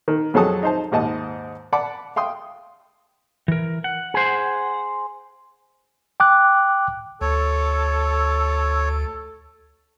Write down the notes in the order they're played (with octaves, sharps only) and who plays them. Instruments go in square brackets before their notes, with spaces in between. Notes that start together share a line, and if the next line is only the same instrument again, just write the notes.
[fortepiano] D#3
F2 F#3 G#3 A4 A5 D#6
D#4 C5 A5
D#2 G#2 D#5 A5
D5 F#5 A5 B5 D6
F5 G5 C6 D#6
[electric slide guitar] E3 A#4
F#5
[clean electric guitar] G#4 C5
[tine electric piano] G5 D6 F#6
[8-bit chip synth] D2 [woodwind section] A4 [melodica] C#5